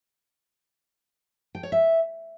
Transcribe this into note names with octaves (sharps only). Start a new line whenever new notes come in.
G5
C#5
E5